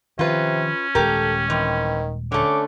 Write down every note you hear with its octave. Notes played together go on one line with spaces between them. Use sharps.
C3 D#3 F3 C#4 F4 B4
D#1 G#3 G4 A4 A#4
D#3 E3 C4
D3 A3 C#4 D6